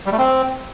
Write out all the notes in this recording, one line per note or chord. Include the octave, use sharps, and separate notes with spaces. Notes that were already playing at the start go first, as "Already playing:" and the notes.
G3
A3
C4